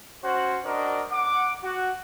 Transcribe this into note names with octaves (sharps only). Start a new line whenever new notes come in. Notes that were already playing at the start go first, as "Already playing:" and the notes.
C#4 F#4 C5
D4 F#4 A#4 C5 D5 D#5
F#5 D6
F#4